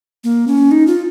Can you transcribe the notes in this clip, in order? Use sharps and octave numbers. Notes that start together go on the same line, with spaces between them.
A#3
C#4
D#4
F4